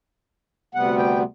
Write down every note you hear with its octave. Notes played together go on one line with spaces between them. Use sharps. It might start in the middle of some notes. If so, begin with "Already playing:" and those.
D2 C3 G3 B3 F#5
G5